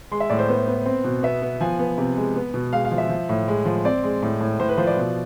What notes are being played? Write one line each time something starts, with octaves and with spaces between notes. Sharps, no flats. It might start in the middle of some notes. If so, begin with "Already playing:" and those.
G#3 C6
E5
A2 D5
C5
B3 C5
B3
C4
B2
B3 E5
B3
F3 G#5
B3
C3
G#3
B3
B2
G#3 F5
F5
F3
E5
F3
A2
G#3
F3
C4 D5
G#3
A2
A2
A2 C5
B4
F3 C5
D5
B2